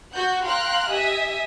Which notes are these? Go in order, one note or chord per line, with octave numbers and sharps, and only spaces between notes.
F#4 F#5 F#6 G6
F5 G5 A#5 C6 F6 F#6
G4 D#5 E5 G#5 D#6